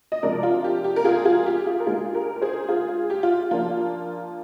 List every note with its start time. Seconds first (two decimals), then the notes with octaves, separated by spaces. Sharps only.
0.12 D#5
0.23 C3 F3 G#3 D4 A#4 D5
0.43 F4
0.64 G4
0.84 G4
0.96 A#4
1.05 F4 G#4
1.25 F4 G#4
1.46 G4
1.66 F4 G#4
1.80 A#4
1.86 D3 G#3 D#4 F4 G#4
2.14 G4 A#4
2.36 A#4
2.42 G#4 C5
2.69 F4 G#4
3.10 G4
3.23 F4
3.51 F3 A#3 D4 F4